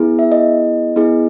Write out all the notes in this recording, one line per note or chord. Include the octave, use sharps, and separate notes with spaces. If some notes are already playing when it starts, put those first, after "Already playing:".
Already playing: B3 E4 G#4
E5
D#5
B3 E4 G#4